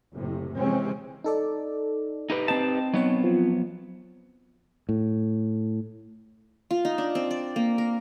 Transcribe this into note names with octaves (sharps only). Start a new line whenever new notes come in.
F#1 A2 C3
C3 E3 F3 G#3 C4 C#4
D#4 A4 D5
D#4 G4 B4
C4 D#5 G5 A5
F#3 B3 D#4 C#5
F3
A2
F4
D#4
D4
C4
D5
A#3
A#4